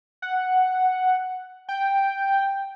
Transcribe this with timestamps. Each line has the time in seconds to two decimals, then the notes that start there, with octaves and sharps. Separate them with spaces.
0.22 F#5
1.69 G5